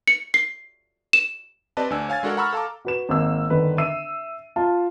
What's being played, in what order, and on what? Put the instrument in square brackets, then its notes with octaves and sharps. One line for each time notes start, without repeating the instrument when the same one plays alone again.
[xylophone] C#7
C7
E7
[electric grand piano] C4 G4 B4 D5 D#5 A5
D2 D4 G#5 E6
C#5 F5 G#5 G#6 A6
G#3 D4 F#4 A4 A#4 F#5
F#5 A#5 B5 C#6 E6 F6
A4 F5 A5 A#5 D6
[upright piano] F#4 B4 E7
G#1 A#3 E6
G1 D3 D#3 B4
E5 E6 C7 D#7
F4 A5